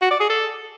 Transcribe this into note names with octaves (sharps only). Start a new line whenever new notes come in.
F#4
D5
G#4
A4